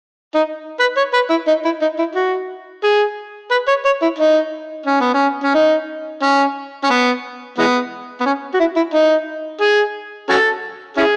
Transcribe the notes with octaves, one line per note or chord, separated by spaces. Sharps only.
D#4
B4
C#5
B4
E4
D#4
E4
D#4
E4
F#4
G#4
B4
C#5
C#5
E4
D#4
C#4
B3
C#4
C#4
D#4
C#4
C#4
B3
E3 G#3 B3
B3
C#4
F#4
E4
E4
D#4
G#4
C#4 F#4 A4
C#4 E4 G#4